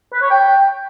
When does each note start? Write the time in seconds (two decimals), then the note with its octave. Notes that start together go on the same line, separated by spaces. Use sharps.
0.13 B4
0.22 C#5
0.31 G5